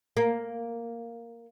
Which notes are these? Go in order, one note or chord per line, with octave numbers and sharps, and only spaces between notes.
A#3